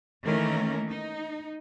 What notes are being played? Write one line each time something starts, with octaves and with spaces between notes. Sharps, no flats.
D#3 E3 A3 A#3 C#4 A#4
D#4